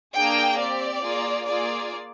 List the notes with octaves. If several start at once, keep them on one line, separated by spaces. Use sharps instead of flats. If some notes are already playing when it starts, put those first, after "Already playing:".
A#3 D4 G#4 G5
C4 G4 D5
A#3 F4 G#4
A#3 F4 G#4 D5